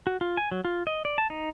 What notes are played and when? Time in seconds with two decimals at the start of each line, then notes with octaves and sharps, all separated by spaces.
0.07 F#4
0.21 F4
0.37 G#5
0.51 F#3
0.65 F4
0.87 D#5
1.05 D5
1.18 A5
1.30 D#4